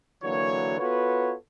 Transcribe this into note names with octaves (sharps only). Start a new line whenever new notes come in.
D3 E3 F#3 A#3 F#4 C#5
B3 F4 F#4 A4 B4 C#5